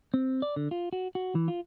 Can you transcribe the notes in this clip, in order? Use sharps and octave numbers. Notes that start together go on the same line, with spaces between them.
C4
D5
D3
F4
F#4
F#4
E3
F4